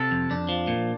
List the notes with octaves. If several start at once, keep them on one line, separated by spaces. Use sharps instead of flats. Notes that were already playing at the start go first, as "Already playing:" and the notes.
Already playing: C3 A4
F2
F2 D4
F3
A#2